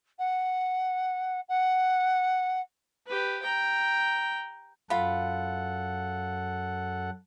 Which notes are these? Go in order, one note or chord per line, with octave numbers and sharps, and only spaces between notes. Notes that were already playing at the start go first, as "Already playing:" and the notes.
F#5
F#5
G4 B4
G5 A#5
F#2 F4 A4 F#5 B5